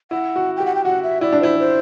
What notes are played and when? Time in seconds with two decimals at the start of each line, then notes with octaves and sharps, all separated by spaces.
0.11 E4 F#5
0.36 F#4
0.57 G4 G5
0.66 F#5
0.75 G5
0.85 F#4 F#5
1.03 E5
1.21 E4 D5
1.33 D4
1.40 E4 C5
1.59 C5